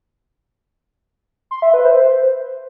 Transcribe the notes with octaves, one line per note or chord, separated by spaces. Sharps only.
C6
E5
B4
C5